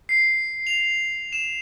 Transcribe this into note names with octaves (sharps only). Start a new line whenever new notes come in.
C7
F7
E7